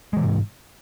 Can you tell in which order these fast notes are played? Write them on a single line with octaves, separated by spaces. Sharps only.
G#3 E3 C3 G#2